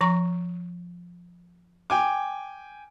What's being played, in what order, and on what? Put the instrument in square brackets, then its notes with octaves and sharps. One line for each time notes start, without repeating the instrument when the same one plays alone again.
[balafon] F3 A#5 C#6
[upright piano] G5 G#5 D6